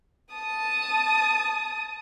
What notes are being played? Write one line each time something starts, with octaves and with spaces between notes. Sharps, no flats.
A5 D#6